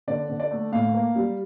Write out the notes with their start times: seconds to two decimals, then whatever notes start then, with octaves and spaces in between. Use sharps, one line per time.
0.07 D3 D5
0.29 D3
0.40 D5
0.51 A3
0.72 A2 F5
0.94 A#3
1.16 G3